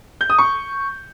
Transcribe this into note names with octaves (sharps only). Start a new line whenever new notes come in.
G6
D#6
C#6